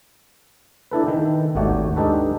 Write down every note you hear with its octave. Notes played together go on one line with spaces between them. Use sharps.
D4 E4 A4 B4
D#3 E3 G5
G#1 D#2 A3 F#4 D5 G5
G#3 D4 D#4 G4 A4 B4